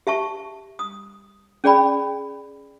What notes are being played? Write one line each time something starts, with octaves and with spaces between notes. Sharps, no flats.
G4 E5 A5 C#6
D#6
C#4 G#4 D5 G5 B5